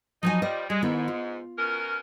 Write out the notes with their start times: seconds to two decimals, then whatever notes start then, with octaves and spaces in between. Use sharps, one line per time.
0.23 F3 F#3 D#4 G#5
0.42 F3 G3 C5 D#5
0.70 G3 G#3
0.82 G#2 D#3 B3 E4
1.08 F4
1.58 B2 C#4 A#4